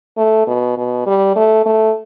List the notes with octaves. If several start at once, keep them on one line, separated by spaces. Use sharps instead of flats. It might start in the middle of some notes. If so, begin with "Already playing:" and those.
A3
B2
B2
G3
A3
A3